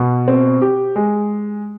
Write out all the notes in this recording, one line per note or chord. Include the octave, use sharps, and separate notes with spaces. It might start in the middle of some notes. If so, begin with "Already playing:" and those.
Already playing: B2
C4
G4
G#3